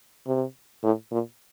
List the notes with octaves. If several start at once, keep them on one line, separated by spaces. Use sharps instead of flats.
C3
A2
A#2